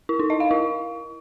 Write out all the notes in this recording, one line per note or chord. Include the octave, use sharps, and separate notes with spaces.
E4
D#4
D#5
F5
E4